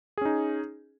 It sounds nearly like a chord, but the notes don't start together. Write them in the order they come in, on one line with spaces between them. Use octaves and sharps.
G#4 C#4 D#4